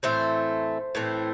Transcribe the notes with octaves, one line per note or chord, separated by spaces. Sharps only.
A2 E3 A3 C4 C5
A2 E3 A3 C4